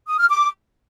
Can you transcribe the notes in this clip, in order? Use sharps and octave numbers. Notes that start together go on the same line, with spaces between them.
D#6
F6
D6